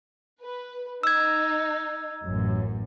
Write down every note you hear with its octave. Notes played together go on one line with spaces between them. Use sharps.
B4
D#4 E6 G#6
A1 F#2